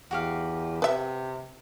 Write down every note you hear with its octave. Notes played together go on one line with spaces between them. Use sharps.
E2 F#4 G4 F5
C3 B4 E5